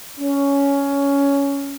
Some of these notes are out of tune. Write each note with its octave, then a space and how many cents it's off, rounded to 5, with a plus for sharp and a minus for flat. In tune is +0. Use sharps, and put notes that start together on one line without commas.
C#4 +15